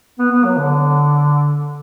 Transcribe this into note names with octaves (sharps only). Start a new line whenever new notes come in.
B3
B3
F#3
D3